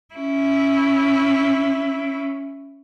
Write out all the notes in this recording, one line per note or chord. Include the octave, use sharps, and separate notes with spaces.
C#4 E4